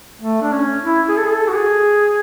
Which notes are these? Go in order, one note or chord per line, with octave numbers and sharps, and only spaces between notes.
A3
D4
C#4
E4
G#4
A4
G#4
A4
F#4
G#4